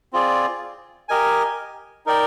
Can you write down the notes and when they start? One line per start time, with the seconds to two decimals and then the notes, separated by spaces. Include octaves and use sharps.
0.13 C4 F4 G#4 D5
1.09 G4 A#4 D#5 G#5
2.06 D#4 A#4 D5 G5